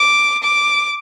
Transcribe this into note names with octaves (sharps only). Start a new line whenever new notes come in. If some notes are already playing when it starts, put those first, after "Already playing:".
Already playing: D6
D6